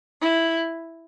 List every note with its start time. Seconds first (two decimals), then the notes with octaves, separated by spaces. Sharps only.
0.19 E4